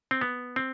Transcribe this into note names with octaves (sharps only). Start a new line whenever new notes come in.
C4
B3
C4